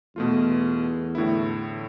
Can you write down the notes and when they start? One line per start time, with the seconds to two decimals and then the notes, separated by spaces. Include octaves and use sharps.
0.16 E2 B2 A3 F4
1.15 A2 D3 E4